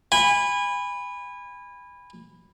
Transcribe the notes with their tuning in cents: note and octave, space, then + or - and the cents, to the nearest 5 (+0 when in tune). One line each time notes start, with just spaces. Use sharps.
G#5 -30 B5 +0